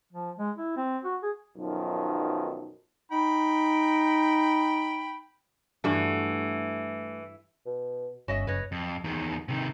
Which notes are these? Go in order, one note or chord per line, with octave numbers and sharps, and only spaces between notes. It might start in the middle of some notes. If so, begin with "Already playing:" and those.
F3
G#3
E4
C4
F#4
G#4
B1 F#2 D#3 F3
D#4 G5 B5
G2 E3 A3 F#4
B2
G1 C#4 F#4 D#5 E5
F#1 B4 C#5 D#5
F2
E2 D#3
C3 D#3